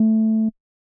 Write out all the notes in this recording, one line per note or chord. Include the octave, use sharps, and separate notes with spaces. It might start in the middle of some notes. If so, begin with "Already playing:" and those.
Already playing: A3